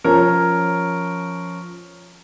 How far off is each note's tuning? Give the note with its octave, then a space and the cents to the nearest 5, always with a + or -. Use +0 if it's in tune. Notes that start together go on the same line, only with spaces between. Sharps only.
F3 +0 C#4 +0 A#4 +0